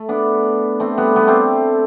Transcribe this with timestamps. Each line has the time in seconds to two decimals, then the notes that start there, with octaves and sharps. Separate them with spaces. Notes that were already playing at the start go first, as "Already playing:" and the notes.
Already playing: A3
0.09 B3 D4
0.80 A3 C4
0.97 G3 B3
1.16 G3 B3
1.27 A3 C4